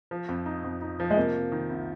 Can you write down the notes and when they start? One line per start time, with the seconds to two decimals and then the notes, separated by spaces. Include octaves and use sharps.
0.11 F3
0.29 F2
0.46 D#4
0.64 F2
0.82 D#4
1.00 F3
1.10 G#3
1.17 C3 A#3
1.35 C3
1.52 D#3
1.70 C2